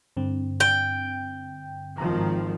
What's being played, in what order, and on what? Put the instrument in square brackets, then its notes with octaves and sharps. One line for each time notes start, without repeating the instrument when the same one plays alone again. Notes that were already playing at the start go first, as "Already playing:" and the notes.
[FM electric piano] G2 D3 C4
[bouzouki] G5
[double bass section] G#1 D#3 F3 [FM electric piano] A#5